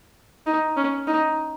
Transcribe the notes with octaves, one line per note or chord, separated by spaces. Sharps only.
D#4
C#4
D#4